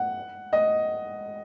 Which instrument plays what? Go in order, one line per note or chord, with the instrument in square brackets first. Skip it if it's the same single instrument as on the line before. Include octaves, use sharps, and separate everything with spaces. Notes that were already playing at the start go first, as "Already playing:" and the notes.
Already playing: [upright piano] F#5
D#5